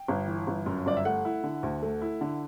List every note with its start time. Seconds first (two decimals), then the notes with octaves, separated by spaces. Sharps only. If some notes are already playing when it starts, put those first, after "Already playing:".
Already playing: G5
0.08 G1
0.28 E3
0.47 G1
0.66 F#2
0.86 G1 D5
0.97 E5
1.05 A3 F#5
1.25 E4
1.43 D3
1.63 D2
1.82 A3
2.02 E4
2.21 D3